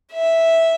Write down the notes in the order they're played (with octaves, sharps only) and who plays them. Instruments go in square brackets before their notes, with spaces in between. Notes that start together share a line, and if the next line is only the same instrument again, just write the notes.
[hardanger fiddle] E5